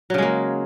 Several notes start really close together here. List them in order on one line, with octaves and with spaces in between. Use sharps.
F#3 C#3 G#3 A#3